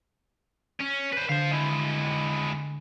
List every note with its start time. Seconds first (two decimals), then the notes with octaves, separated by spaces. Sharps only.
0.80 C#4
1.13 B4 C5
1.29 D3 C5 F5
1.51 G#3 E4